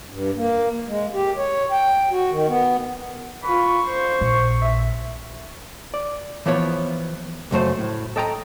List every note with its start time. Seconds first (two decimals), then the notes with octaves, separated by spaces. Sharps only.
0.10 G2
0.36 A#3
0.88 G#3
1.13 G4
1.37 C#5
1.72 G5
2.11 F#4
2.30 D#3
2.48 B3
3.44 F4 B4 C#6
3.86 C5
4.21 A#1
4.62 E5
5.94 D5
6.46 E3 F3 B3 C#5
7.51 C#2 F#2 A3 C5
7.78 A2
8.16 A4 D#5 G5 A5 A#5